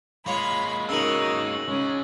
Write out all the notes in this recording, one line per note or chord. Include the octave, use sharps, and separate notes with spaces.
G#3 A#3 F4 C#5 B5
C#3 D#4 F#4 A#4 E6 F#7
C#3 G#3 C#4